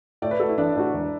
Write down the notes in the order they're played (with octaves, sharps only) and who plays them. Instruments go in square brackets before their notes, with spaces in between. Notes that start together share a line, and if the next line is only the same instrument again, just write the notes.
[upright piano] A2 [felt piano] D5
[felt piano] B4
[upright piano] A3 F#4 [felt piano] A4
[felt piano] E4
[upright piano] A1 [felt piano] D4
[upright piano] A2 A3 F#4
E1